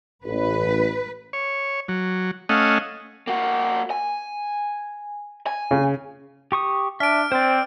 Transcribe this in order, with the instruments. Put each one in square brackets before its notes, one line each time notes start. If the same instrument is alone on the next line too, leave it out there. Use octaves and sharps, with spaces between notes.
[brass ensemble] A1 [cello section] B4
[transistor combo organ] C#5
F#3
A3 C#4 D#5 F5 F#5 G#5
[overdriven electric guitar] A#3 F#4
G#5
G#5
[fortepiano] C#3
[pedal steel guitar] G4 C#6 D#6
[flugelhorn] D4 [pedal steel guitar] E5 [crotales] F6 D7
[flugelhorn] C4 [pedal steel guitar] C5 D5